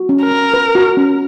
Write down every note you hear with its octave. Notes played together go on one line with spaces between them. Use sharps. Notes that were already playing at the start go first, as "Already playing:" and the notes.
Already playing: F#4
C#4
A#4
C#4
B4
F#4
C#4